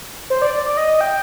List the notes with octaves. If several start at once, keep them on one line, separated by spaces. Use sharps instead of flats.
C5
D5
D5
D5
D#5
G5